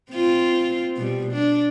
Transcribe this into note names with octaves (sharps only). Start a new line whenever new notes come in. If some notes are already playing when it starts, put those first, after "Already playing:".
C4 F4
B2 G3
D4